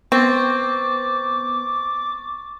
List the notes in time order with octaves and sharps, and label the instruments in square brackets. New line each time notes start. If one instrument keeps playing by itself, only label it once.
[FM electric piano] B3 [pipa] C4 [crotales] C#6 A6 [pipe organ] D6